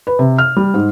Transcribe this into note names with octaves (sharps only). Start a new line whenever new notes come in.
B4
C3
F6
G3
G#2